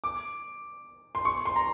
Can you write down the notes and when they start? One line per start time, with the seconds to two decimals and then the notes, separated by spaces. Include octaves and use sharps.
0.04 D6
1.15 C6
1.25 C#6
1.45 C6
1.56 A#5